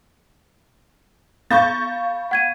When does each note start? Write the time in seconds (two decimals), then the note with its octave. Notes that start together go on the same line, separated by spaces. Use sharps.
1.51 B3 F5 B5 C#6 G6 A6
2.31 F#5 G#6 D#7